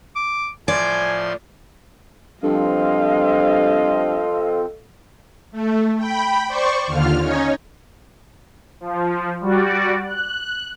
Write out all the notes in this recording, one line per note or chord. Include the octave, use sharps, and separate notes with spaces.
D6
A2 F3 D5 G#5 C6
G2 F3 C4 A4 D#5 F5
A3
G5 B5
C5 D5 C#6
D#2 D3 F4 F6
C#4 D#4 C#5
F3
G3 F#4 D5
F#6